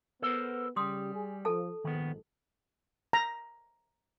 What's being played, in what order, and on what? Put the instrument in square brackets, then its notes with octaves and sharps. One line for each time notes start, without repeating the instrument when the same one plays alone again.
[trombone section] B3 [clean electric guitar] A4 A#4 C5
[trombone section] C#3 G4 [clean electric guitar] G3 [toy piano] C6 D#6
[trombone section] G#4
[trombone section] F3 [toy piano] A4 A5
[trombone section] A#1 G#2 [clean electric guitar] D#3 B3
[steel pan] A#5